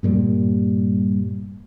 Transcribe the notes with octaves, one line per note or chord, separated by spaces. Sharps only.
G2 A#2 G3